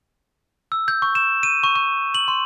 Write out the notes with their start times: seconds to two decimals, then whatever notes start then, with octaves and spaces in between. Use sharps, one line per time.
0.72 E6
0.88 G6
1.02 C#6
1.15 E7
1.43 D#7
1.63 C#6
1.76 C#6
2.14 F#7
2.28 C6